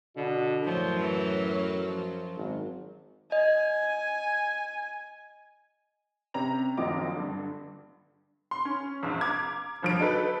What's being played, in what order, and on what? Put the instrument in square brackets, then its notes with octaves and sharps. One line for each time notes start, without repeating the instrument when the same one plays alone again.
[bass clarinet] B2 [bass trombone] D3
[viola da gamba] F#2 F#3 [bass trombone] A2 [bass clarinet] F3
[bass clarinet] E3
F3
[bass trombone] G#1
[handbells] D#5 [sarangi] G#5
[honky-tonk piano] C3 C#4 A#5 F7
A#1 F#2 D#3 F3 D#5 D6
G2 D3
C6
C#4
A#1 E2
A#5 D6 G#6
G1 F3 D7
F#3 D#4 A4 B4